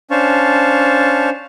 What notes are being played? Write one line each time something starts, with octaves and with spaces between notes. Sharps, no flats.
C#4 D4 C5 F5 A5 C#6